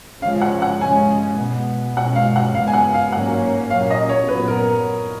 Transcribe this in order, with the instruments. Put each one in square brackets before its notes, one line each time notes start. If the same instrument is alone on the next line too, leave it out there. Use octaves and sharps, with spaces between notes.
[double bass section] C#3 F3 G#3 C#4 [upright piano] F5
[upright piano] F#5
F#5
[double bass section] C#3 G#3 C#4 [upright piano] G#5
[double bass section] B2 G#3 B3
[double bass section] B2 G#3 C#4 [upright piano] F#5
[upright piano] F5
F#5
[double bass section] F#2 C#3 G#3 B3 [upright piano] F5
[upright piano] G#5
F#5
F5
[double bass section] G#2 F#3 A#3 C#4 [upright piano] F#5
[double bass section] A#2 F#3 A#3 C#4 [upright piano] F5
[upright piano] D#5
C#5
[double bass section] A#2 F#3 B3 [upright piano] B4
[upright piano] A#4